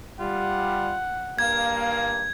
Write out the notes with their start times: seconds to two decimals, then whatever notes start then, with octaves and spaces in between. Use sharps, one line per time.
0.20 G3 F4 F#5
1.39 G2 A#3 F5 G#6